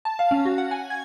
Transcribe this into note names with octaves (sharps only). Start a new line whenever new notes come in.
A5
F5
C#4
F#4
F#5
G#5
G#6